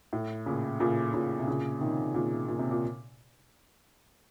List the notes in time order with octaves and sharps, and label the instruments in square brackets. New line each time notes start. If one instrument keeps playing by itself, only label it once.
[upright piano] A2
A#2 C#3
A#2 C#3
A#2 C#3
C3
A#2 C#3
C3 D#3
A#2 C#3
A#2
C3
A#2